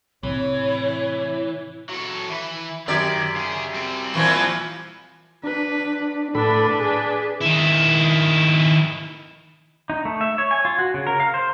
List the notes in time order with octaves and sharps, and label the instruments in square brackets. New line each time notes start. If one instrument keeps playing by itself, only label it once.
[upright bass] A2 C3 [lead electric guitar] E3 [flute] C#5
[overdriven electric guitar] F#3 A4
E3 B4
[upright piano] F#2 G4 G#6 [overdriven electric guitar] D#3 [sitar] D5
[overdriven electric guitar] C#3 G#4
G3 C4
[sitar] A#2 E3 F3
[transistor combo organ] D4 [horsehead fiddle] B4
[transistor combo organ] A2 A4 B5 [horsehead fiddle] D4 B4
[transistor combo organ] G#4
[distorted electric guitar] D#3 E4
[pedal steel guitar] D#4
A3
E5
C#5
G#5
F4
F#4
C#3
A#4
F5
C5